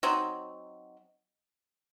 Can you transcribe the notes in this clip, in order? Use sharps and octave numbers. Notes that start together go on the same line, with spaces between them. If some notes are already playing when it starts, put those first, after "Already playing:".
F#3 C4 D#4